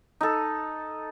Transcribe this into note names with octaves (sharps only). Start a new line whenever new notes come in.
D#4 A4